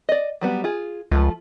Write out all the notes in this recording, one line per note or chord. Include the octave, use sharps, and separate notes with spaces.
D5 D#5
F#3 G3 B3
F4 G#4
C#2 F3 A3 F4